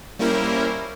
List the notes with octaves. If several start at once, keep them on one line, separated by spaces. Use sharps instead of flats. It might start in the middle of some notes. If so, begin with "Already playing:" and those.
G3 A#3 C#4 E4 A#4 C5